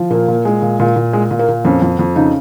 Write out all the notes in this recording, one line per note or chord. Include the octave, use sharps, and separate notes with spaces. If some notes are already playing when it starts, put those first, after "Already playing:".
Already playing: F3
A#2 A#3
A#2
G#3
A#2
A#2
A#2
G#3
A#2
A#3
A#2
F2 C#4
F2
F2
C#3 D#4